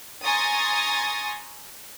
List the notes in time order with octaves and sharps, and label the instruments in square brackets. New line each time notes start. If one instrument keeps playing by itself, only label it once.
[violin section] G#5 A#5 C6 C#6 D#6 A6